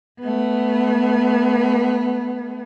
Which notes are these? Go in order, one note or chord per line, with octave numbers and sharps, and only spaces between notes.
A3 B3